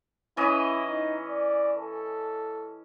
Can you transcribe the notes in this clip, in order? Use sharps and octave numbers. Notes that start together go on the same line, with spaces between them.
E3 C#4 E4 D#5
D#4
D5
A4